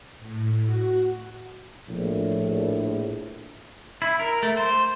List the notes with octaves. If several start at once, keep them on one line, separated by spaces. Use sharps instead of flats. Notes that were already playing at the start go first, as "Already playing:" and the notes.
A2
F#4
A#1 A2
E4
A#4
A3
C5